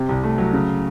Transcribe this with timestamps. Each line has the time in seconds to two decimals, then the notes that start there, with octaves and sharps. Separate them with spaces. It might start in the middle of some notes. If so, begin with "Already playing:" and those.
Already playing: C3
0.09 C2
0.24 A3
0.38 F#3
0.53 C#3